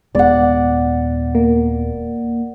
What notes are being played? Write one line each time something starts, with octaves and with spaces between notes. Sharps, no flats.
D#1 G#3 B3 D5 F#5
A#3